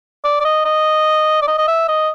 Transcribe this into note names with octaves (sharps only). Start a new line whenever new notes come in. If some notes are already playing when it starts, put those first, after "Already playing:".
D5
D5
D#5
D#5
D5
D#5
D#5
E5
D#5